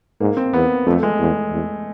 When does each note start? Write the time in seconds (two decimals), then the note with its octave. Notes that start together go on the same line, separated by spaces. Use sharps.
0.20 G#2 A#3
0.37 C4
0.53 E2 B3
0.86 F2 A3
1.03 G#3
1.20 E2
1.52 E2